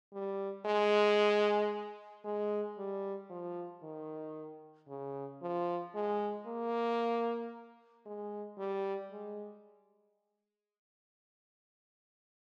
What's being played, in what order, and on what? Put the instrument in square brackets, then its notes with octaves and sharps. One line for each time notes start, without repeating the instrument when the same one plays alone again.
[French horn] G3
G#3
G#3
G3
F3
D#3
C#3
F3
G#3
A#3
G#3
G3
G#3